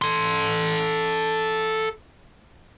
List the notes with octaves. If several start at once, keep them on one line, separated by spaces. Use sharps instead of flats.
A4 C6